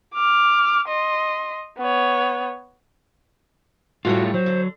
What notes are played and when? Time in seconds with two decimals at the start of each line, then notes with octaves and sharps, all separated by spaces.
0.14 D6 F6
0.88 D#5 C6
1.78 B3 C#5
4.05 A2 G3 A3 F4 F#4 C#5
4.34 F#3 C5
4.46 D3